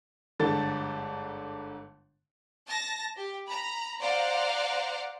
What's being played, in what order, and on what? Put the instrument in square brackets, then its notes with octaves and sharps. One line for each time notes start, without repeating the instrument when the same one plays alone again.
[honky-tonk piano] G1 G#2 D3 A4 A6
[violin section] A5 A#6
G4
A#5 B5
C5 D5 F5 F#5 A#5